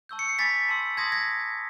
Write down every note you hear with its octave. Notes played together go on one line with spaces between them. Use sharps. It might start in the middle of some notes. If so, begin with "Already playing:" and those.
A5 C#6 E6 G6
C#7
C7
G#5 B5 D6 A6 B6
A5 C6 E6
A5 C6 D#6 G#6 A#6
G#6 A#6